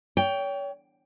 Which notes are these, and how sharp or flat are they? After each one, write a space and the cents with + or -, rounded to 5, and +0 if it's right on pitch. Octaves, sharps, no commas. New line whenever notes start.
C#5 +35 G5 +0